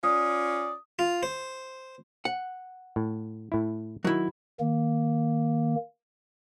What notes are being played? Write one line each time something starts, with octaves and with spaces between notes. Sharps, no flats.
C#4 F4 D5 D#6
F4
C5
F#5
A2
A2 E4
D#3 F#3 E4
D#3 A#3